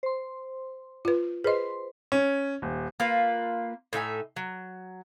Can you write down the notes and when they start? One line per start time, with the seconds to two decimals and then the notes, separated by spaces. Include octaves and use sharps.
0.03 C5 C6
1.05 F4 B4
1.44 G#4 B4 C5 D#5 C6
2.12 C#4
2.62 D#1
3.00 A#3 F4 B4
3.93 A2 D#4 E5 G#5
4.36 F#3